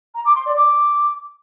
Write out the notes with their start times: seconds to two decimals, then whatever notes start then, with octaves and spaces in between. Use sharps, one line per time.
0.15 A#5
0.25 D6
0.36 C6
0.46 D5
0.56 D6